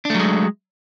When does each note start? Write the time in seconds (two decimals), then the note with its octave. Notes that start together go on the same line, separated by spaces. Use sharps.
0.05 D4
0.10 A3
0.15 F#3
0.20 G#3